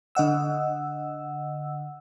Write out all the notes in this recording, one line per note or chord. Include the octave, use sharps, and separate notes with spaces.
D3 D#5 F#5 E6